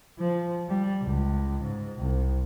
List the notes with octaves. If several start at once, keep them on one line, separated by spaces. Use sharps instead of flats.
F3
G3
C#2
G#2
C2